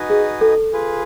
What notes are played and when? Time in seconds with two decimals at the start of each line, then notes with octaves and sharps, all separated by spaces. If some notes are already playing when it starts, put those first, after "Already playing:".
Already playing: D#4 F#4 B4 D#5 G#5
0.10 G#4
0.41 A4
0.73 F4 G#4 B4